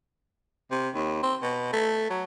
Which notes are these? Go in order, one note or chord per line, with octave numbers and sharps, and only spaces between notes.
C3
D#2
C4
B2
A3
F#3